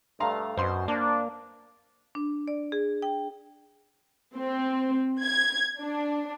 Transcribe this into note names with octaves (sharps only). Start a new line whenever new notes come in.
G2 A3 F5 A#5 C6
F#2 B2 C5 C6
A#3 D4
D4
D5
G#4
G5
C4
G#6
D4